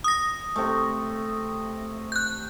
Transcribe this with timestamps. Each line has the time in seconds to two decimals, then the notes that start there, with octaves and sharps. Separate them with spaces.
0.04 D#6 A#6
0.56 C3 A3
2.12 F#6 G6